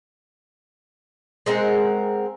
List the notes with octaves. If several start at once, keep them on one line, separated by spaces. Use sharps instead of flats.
G#3 C4 A#4 F#5